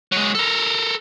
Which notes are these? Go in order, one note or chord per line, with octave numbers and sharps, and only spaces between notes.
F#3 G#3
A4 A#4